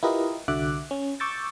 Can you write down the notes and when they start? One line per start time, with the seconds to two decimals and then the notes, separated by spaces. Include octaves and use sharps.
0.03 E4 F4 G4 A#4 B4 D#5
0.48 C2 D3 F#4 E5 D6 F#6
0.91 C#4
1.20 C#6 D6 E6 G6 A6